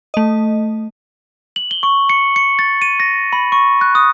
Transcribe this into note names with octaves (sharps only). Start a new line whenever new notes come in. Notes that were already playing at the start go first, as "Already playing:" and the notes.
A3 D#5
F#7
G7
C#6
C#7
C#7
A6
D#7
A#6
B5
C#6
F#6
D#6